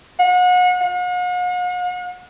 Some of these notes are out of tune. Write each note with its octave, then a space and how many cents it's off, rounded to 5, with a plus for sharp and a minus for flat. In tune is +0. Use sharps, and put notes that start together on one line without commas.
F#5 -35
F#5 -45